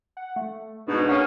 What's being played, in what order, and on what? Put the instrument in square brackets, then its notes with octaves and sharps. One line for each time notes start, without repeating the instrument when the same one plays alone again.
[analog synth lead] F#5
A3
[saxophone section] G#2 B2 [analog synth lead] D4
[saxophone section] A#3 C#4 [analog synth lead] F#5